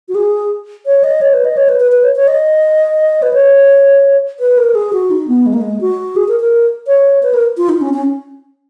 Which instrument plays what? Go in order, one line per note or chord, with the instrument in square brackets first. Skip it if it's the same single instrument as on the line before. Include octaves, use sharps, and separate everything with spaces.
[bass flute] F#4
G#4
C#5
D#5
C#5
B4
D#5
C#5
B4
B4
B4
C#5
C#5
D#5
B4
C#5
B4
A#4
G#4
F#4
D#4
B3
G#3
A#3
G#3
F#4
G#4
A#4
A#4
C#5
B4
A#4
F4
D#4
C#4
C#4